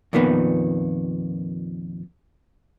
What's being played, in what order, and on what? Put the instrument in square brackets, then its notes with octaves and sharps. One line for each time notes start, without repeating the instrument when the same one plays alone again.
[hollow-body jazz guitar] F2 A#2 D#3 B3